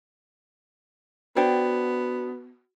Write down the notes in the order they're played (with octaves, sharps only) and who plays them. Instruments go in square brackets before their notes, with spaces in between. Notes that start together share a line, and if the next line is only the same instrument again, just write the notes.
[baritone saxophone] B3 [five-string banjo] D4 C5 G5 [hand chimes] F#4